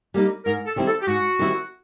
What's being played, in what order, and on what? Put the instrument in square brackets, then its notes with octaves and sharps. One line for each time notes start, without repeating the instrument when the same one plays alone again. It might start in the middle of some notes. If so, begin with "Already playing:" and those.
[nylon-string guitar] G3 A#3 D#4
[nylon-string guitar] G#2 [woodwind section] A#4
[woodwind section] A4
[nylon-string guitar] D#3 G3 C4 E4
[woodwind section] A4
G4
[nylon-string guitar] G#2 [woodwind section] F#4
[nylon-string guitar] D#3 G3 C4 E4